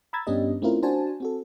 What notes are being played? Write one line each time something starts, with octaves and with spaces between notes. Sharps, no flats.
A#5 B5 E6 G#6 A6
G2 B3 C#4 D4 G4 D#5
A3 C4 C#4 E4 F4 A#4
D4 F#4 C5 G#5 A5
C4 F#4 A4